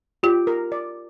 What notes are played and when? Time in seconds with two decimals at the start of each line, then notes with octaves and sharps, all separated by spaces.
0.23 F4 G4
0.47 A#4
0.72 D5